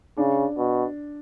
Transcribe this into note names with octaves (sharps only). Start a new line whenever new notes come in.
C#3 D4
B2